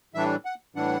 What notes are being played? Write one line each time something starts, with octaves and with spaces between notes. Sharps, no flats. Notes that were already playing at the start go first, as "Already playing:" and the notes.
A2 E3 G3 D4 E5
F#5
A2 E3 G3 D4 F#5